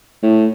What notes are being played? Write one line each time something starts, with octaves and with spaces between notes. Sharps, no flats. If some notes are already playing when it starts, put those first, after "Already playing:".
A2